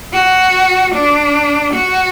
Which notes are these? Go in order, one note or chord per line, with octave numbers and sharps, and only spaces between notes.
F#4
D4
F#4